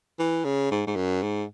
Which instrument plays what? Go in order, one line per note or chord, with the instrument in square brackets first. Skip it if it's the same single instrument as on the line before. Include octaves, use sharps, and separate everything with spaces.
[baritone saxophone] E3
C#3
G#2
G#2
F#2
G#2